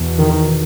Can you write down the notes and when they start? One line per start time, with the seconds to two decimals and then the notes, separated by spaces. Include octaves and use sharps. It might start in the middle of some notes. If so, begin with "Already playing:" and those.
Already playing: E2 B2
0.20 D#3